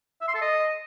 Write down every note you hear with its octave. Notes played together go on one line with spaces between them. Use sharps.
E5
C6
A4
D#5